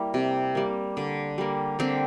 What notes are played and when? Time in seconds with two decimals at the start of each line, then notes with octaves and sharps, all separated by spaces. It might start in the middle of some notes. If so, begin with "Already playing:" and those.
Already playing: G3 A#3 E4
0.14 C3
0.55 G3 A#3
0.97 D3
1.38 G3 A#3
1.79 D3 C4